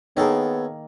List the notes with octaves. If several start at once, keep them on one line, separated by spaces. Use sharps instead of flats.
D#3 A#3 B3 G#4 A4 C#5